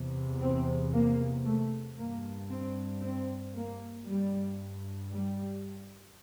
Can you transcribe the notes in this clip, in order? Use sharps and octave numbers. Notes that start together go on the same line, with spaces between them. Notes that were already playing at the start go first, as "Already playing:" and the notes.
Already playing: E2 C3
C4
A#3
A3
G2 A#3
C4
C4
A#3
G2 G3
G3